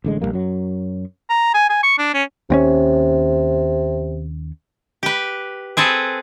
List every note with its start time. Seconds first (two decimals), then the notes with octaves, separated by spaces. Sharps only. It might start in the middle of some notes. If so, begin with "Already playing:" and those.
0.04 A1 D3 G#3
0.22 A#1 G#2 G3 A#3
0.33 F#2 F#3
1.30 A#5
1.54 G#5
1.69 G#5
1.83 C#6
1.98 D4
2.14 C#4
2.50 D#2 C3 C4 C#4
5.03 G4 B4
5.77 C4 G#4 A4 B4